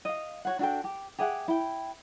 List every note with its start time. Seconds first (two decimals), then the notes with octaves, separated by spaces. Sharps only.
0.05 D#5 F5
0.45 F#4 C#5 F#5
0.59 D4 F#4 A4 G5
0.84 G4
1.19 G4 G#4 E5 F#5
1.48 E4 G5